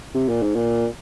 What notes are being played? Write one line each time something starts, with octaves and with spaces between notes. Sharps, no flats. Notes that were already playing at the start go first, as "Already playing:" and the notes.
C3
A#2
G#2
A#2